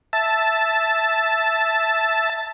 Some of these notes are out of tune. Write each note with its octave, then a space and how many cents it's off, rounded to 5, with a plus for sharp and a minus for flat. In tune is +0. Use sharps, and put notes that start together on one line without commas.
E5 +0 A5 +0